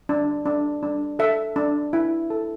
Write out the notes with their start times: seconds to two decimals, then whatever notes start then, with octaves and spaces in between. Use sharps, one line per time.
0.09 D4
0.46 D4
0.83 D4
1.19 A4 E5
1.56 D4
1.93 E4
2.30 A4